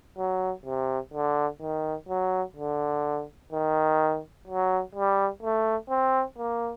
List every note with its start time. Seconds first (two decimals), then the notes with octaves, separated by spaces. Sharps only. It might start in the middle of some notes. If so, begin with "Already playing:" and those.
0.18 F#3
0.66 C3
1.14 D3
1.61 D#3
2.09 F#3
2.56 D3
3.52 D#3
4.48 F#3
4.95 G3
5.43 A3
5.90 C4
6.38 A#3